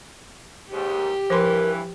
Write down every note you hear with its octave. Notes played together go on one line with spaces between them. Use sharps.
D#2 G#2 G4
G2 E3 F3 A#4 B4 C6